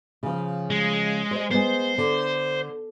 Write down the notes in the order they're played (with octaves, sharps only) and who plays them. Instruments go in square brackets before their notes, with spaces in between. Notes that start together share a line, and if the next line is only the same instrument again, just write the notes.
[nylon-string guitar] C#3 F3
[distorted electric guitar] G#3
[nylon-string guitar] C5 D#5
[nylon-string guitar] G#3 B3 [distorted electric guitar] C5
[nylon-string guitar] D3